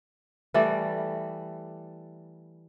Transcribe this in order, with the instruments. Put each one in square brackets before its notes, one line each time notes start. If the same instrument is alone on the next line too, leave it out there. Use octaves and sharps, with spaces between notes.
[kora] E3 G3 A3 D5